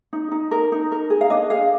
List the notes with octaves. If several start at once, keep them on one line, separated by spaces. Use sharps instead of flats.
D#4
D#4
A#4
D#4
A#4
G#4
F5
D4 D#5
G#4 F5